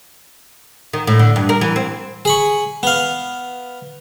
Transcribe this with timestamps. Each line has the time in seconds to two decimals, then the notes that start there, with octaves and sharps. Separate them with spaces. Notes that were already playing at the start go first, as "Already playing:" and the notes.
0.93 D#3
1.07 A2
1.19 D3
1.36 G2
1.49 A#4
1.61 E3
1.76 C4
2.25 G#4 B5 C#6
2.83 B3 F5